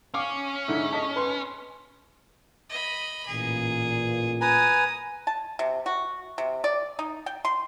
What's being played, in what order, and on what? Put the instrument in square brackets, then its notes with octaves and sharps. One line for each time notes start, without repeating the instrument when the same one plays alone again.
[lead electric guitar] C#4 [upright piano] F5 D6
[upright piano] G#2 D3 E4
D#5 A5
B4 C6
[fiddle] D#5 B5
[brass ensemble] A1 A#2 [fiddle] G#4
[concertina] B4 G#5 A#5 [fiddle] D#6
[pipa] A5
C3
F#4
C3
D5
D#4
G5
C6